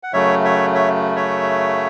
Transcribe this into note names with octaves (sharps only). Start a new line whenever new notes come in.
F#5
F#2 C#3 F#3 A3 C#5 E5
C#5 E5
C#5 E5
C#5 E5